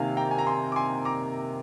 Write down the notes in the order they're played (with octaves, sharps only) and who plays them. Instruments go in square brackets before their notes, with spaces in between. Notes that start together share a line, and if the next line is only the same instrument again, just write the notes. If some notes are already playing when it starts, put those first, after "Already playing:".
Already playing: [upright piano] C3 D#3 A#3 [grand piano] F5 G#5
[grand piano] G5 A#5
G#5
A#5
G#5 C6
D6
G#5 C6
A#5 D6